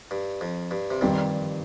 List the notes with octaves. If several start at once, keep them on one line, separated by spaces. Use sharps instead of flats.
G2
F2
G2
C3
G2 A#2 D#3 G3 C4 D#4